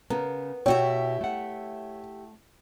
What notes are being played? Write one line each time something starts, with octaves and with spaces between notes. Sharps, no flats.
C#3 B3 A#4
B2 E4 F#4 G4 C#5 E5 G5
A3 F#5